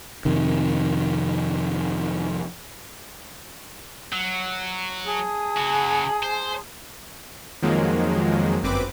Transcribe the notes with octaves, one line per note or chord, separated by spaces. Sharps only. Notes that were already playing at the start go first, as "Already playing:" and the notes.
F2 C3 D#3
F#3
G#4 A5 D#6
C#3 F#4
C5
F2 D#3 F3 F#3 G#3 A#3
G1 F#2 C4 B4 D6